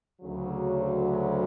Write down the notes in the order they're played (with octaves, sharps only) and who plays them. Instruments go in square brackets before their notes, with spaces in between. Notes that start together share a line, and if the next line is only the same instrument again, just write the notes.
[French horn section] D2 C#3 F#3